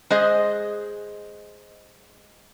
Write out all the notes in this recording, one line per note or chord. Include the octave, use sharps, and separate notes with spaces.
G#3 G#4 C5 D#5